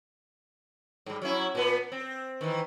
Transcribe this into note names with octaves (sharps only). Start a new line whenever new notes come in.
G#2 G3
F#3 C#4 E4
A#2 B3
C4
D#3 E3